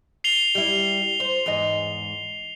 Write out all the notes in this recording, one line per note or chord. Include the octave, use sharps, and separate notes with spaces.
C7 F7 G7
G3 E4
C5
E2 G#2 D#5